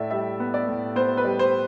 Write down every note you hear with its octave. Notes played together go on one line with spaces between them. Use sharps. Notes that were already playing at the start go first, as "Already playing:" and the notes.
Already playing: A2 D5 E5
G3 E5
B3
D5
A2
B3 C5
B4
G3
C5